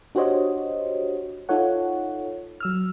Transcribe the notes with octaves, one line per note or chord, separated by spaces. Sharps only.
D4 F#4 G4 C5 C#5 D#5
D#4 F4 A4 C#5 F#5
F#3 E6 F6